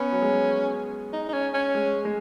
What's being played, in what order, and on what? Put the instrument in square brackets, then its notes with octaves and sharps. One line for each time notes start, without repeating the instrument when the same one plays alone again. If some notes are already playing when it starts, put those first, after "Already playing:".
Already playing: [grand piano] B3 [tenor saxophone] C#4
[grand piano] F#3
G#3
[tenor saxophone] D#4
D#4
C#4
C#4
[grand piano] G#3
G#3